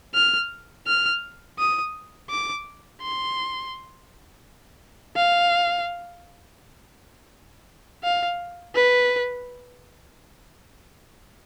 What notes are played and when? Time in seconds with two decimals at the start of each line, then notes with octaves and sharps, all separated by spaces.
0.14 F6
0.87 F6
1.59 D#6
2.30 D6
3.02 C6
5.16 F5
8.03 F5
8.75 B4